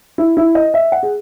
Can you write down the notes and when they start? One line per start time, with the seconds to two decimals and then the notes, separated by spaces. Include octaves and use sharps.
0.18 E4
0.37 E4
0.55 D#5
0.74 E5
0.92 F#5
1.03 G#4